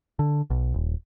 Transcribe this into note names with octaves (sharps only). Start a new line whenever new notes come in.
D3
B1
D#1